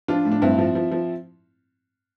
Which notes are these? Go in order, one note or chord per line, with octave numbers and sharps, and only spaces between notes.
F3 D4 F4
A2
D4
G2 C4 E4
F3
F3
F3